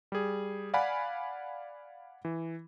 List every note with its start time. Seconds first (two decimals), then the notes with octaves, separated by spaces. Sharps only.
0.12 G3 G#4
0.74 D5 F5 F#5 G#5 B5
2.25 E3